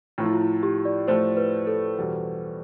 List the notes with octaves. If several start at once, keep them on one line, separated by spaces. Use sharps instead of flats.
A2 F3 A3 F4
E4
F4
E4
G4
D5
A2 F3 A3 C5
B4
A4
E2 B2 G3